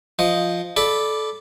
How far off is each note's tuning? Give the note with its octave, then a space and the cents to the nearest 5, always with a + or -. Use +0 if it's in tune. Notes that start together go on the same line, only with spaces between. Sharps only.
F3 +0 D#5 +0
A4 -20 D5 +0 B5 +0